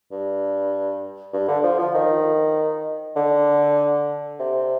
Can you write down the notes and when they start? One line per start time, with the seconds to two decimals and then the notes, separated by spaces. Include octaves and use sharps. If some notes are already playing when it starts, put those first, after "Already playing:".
0.11 G2
1.33 G2
1.48 D3
1.64 F3
1.79 F3
1.94 D#3
3.16 D3
4.39 C3